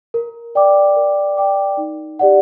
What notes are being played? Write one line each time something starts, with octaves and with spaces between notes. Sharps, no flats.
A#4
D5 G5 D6
A#4
D5 G5 D6
D#4
G4 D5 F#5